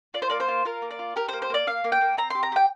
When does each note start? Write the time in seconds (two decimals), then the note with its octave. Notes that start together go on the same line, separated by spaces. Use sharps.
0.14 F4 D5
0.22 C5
0.30 A#3 D5
0.40 C5
0.48 F4
0.65 F4 A#4
0.82 A#3
0.91 D5
0.99 F4
1.16 G4 A#4
1.28 C5
1.33 A#3
1.42 C5
1.50 A#3 D5
1.67 A#3 F5
1.84 A#3
1.92 G5
2.01 A#3
2.17 C4 A#5
2.30 G4 C6
2.43 A#5
2.52 G4 G5